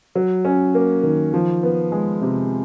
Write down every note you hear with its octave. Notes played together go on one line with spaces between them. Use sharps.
F#3
C#4
A#3
D#3
F3
B3
G#3
C3